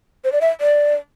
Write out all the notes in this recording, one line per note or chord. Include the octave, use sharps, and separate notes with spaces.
C5
D5
E5
D5